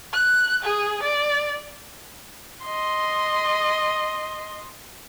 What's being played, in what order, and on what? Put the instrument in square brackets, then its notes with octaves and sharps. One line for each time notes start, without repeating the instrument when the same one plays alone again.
[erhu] F#6
G#4
D5
[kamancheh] D#5 C6